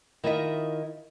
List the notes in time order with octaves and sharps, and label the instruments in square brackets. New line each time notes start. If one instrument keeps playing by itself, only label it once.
[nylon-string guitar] D#3 E4 F4 D#5 E5